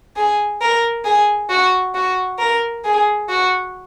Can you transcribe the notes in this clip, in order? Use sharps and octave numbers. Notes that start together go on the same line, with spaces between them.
G#4
A#4
G#4
F#4
F#4
A#4
G#4
F#4